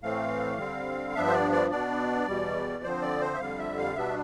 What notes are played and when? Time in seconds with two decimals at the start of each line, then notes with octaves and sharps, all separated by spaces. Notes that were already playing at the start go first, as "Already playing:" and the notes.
0.02 A2 E3 A3 C4 F5
0.58 D3 G3 C4
1.15 G2 F3 B3 D4 E5
1.27 C5
1.33 D5
1.52 D5
1.71 B2 B3 D4 D5
2.27 E2 B2 G3
2.84 D3 F3 C4 C5
3.02 D5
3.21 C5
3.34 E5
3.39 F2 D3 G3 F5
3.58 E5
3.78 F5
3.95 B2 G3 B3 D4 E5